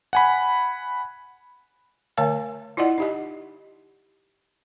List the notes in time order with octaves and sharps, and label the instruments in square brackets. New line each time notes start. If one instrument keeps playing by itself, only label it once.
[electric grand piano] F#5 G#5 B5
[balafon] D3 A3 C#5 F5 G#5
E4 F4 D5 D#5 F#5
D#4 G4 D#5